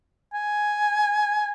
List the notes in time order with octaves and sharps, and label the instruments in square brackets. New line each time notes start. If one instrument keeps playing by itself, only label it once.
[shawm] G#5